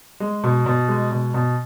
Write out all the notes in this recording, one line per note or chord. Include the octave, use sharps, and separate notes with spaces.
G#3
B2
B2
G#3
B2
B2